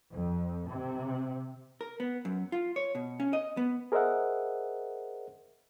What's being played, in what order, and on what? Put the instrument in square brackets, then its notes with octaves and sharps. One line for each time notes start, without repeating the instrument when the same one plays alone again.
[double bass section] F2
C3
[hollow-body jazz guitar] A#4
B3
F#2
F4
C#5
B2
C#4
D#5
B3
[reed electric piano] G#4 A#4 C5 D#5 E5 F#5